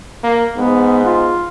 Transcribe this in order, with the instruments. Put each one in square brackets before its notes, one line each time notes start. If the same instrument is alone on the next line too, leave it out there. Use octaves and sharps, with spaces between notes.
[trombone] A#3
[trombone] G#2 [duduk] B3
[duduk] F4